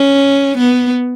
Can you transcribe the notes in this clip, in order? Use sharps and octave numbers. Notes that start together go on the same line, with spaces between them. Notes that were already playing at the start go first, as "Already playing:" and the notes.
Already playing: C#4
B3